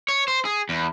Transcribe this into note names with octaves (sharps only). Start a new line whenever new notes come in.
C#5
C5
G#4
E2